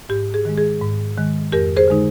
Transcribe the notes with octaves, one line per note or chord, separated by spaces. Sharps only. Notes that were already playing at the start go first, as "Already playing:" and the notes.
G#2 G4
G#4
D#3 G#3
G#4
G#2
D#3 G#3
F2 G4 A#4
G#4 C5
D3 G#3 D#4